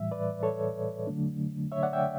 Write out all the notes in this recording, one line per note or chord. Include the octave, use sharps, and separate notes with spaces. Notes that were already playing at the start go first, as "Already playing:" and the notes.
Already playing: A2 E3 G3 E5
B4 D5
A4 C#5
D3 F#3 A3 D4
C#5 E5
D5 F#5
E5 G5